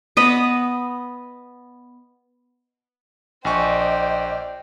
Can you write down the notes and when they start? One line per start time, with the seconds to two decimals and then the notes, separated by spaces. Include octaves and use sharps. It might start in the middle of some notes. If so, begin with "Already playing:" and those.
0.17 B3 D#5 B5
3.45 A#1 C5 D5 D#5 G5 G#5 C#6